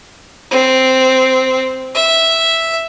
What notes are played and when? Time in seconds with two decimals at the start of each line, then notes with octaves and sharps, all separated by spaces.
0.51 C4
1.95 E5